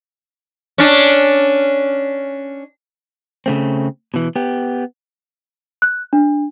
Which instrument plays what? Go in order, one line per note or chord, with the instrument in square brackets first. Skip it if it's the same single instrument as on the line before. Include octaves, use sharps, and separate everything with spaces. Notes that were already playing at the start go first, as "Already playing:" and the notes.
[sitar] C#4 D4
[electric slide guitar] C#3 A3 C4
B2 E3
B3 G4
[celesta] F#6
D4